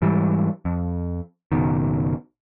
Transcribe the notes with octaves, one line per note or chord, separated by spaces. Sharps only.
G#2 E3 G3
F2
F#1 B1 B2 D#3